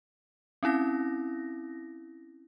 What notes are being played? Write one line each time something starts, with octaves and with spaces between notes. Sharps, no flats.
C4 C#4 E4 A#6